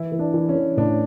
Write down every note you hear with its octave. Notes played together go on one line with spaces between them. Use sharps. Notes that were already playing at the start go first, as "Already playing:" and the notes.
Already playing: E3 E4
E3
D4
E3
C#4
E3
A2 D4